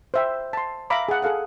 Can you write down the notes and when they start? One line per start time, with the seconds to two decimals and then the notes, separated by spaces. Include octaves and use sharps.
0.14 C5 E5 G5
0.53 A5 C6
0.90 E5 F5 A#5 B5 D6
1.08 G#4 F#5
1.22 G#4 A4 F5 F#5